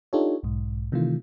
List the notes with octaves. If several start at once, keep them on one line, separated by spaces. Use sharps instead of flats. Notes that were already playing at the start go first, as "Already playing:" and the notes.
D4 D#4 F4 G4 A4 C#5
B1 G#2
C3 D#3 E3 A3 F4